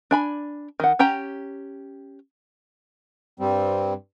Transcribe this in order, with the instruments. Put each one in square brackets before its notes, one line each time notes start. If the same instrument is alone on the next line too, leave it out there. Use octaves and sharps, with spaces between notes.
[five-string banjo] D4 G#5 B5
D#3 F#5
C#4 G4 G5 A#5
[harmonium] G2 G3 C4